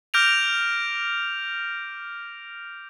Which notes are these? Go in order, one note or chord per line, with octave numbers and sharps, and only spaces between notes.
D6 F6 G6 A#6 D7 F7